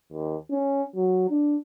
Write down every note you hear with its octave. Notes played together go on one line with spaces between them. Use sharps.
D#2
C#4
F#3
D4